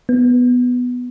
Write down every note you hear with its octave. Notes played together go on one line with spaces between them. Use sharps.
B3